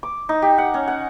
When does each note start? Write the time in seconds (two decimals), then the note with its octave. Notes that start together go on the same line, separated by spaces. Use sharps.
0.03 D6
0.29 D#4
0.42 G4
0.58 F#5
0.74 C#4
0.88 F#5